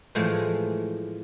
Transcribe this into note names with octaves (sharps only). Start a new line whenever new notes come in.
A2 E3 F3 G#3